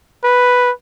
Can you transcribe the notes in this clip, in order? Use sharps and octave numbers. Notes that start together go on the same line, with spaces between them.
B4